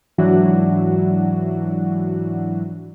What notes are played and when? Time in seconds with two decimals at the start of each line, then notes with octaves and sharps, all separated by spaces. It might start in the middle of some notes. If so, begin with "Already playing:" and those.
0.18 G#2 E3 F#3 D4 E4 F#4